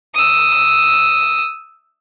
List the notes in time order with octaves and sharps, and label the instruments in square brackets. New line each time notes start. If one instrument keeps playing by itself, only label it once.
[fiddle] D#6 E6